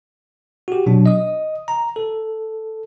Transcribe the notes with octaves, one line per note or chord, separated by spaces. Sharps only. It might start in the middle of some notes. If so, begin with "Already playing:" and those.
F#4 G4
B2 F#3 D4
D#5 D#6
A#5
A4